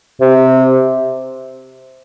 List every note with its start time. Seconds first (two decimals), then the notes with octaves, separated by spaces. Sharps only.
0.21 C3